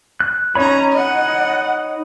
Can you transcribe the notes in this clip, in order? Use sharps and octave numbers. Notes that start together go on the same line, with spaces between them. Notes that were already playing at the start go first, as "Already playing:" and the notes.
F#6
C#4 D#4 C#5 A#5 B5
D#5 F#5